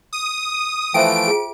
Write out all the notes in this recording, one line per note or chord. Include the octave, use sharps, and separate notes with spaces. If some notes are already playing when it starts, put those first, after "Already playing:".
D#6
E3 F3 A3 C5 E5 G5 D7
F4 G#4